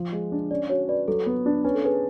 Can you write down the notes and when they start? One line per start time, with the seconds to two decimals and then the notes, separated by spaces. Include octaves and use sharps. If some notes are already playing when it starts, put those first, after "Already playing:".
Already playing: F3
0.12 G#3
0.32 D4
0.51 C#4 D5
0.70 F#4 C#5
0.89 B4 D5
1.08 F#3 A4
1.26 B3
1.46 D4
1.64 C#4 B4
1.75 A4
1.84 G#4 B4